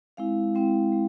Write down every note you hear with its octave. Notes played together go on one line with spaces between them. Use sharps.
G#3 C4 E4 F5
G#3 C4 E4 G5
G#3